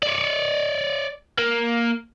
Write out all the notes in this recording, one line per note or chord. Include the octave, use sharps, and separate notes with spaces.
C#5 D5
A#3